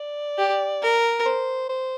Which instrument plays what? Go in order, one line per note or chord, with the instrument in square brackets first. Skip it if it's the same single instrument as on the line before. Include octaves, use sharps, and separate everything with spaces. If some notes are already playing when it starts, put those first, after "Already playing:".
Already playing: [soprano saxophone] D5
[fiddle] G4
A#4
[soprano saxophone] C5
C5